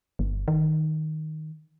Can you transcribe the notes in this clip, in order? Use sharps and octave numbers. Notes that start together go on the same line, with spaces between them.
G1
D#3